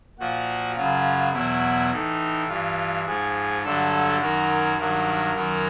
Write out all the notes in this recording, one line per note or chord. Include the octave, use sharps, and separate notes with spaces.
A#2 F3 F#4
F#2 C#3 F#3 F4
E2 B2 F#3 E4
A2 E3 D#4
G2 E3 F4
G#2 F3 G#4
G2 D3 F#3 A4
F#2 D#3 F#3 A#4
G2 D#3 F#3 A#4
F#2 D#3 F#3